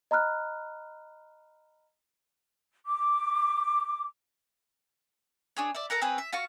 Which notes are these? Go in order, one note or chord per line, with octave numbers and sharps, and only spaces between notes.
D#5 A#5 B5 F6 F#6
D6
D4 G#4 C#5
D5 E5
A4 A#4 F#5 A#5
C4 G#4 B4 C#5
E5
F4 F#4 F5 C#6